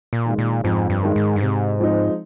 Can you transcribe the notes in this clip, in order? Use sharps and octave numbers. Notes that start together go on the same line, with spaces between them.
A#2
D#3 G#3
A#2
F2 G#2
G2
D#3 G#3
G#2
G2
G#2 C3
F3 G#3 C4 D#4